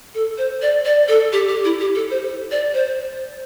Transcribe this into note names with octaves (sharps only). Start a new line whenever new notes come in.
A4
C5
D5
D5
A4
G4
G4
E4
G4
A4
C5
D5
C5